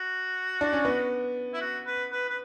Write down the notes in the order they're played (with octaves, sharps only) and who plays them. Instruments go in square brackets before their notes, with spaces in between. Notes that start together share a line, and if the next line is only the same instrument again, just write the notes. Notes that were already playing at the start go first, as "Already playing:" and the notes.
Already playing: [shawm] F#4
[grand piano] D4
C#4
B3
[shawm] E4
F#4
B4
B4
B4